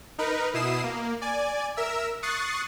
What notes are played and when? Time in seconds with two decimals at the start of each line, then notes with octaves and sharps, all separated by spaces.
0.18 D#4 A#4 B4
0.54 B2 E4 D#6 C7 E7
0.83 A#3
1.21 D5 G#5
1.77 A#4 E5 E6
2.22 C#6 D#6 F#6 A6 C7